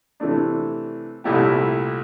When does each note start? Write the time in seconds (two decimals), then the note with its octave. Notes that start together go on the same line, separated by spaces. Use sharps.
0.20 C3 E3 A3 D4
1.24 C2 A#2 A3 E4 G4